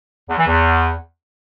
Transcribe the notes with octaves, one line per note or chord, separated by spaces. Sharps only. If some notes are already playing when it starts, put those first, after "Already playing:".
E2
E3
E2